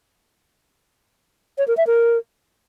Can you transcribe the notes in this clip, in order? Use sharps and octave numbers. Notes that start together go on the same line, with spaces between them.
C#5
A#4
E5
A#4